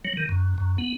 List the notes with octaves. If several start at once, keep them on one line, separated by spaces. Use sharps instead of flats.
F#3
D#3
F#2
F#2
B3